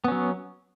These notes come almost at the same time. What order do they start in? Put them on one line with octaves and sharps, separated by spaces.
B3 C#4 F#3